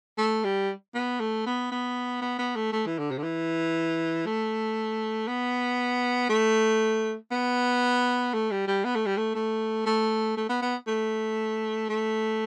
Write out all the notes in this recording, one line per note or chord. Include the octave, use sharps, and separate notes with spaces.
A3
G3
B3
A3
B3
B3
B3
B3
A3
A3
E3
D3
C3
D3
E3
A3
B3
A3
B3
A3
G3
G3
B3
A3
G3
A3
A3
A3
A3
B3
B3
A3
A3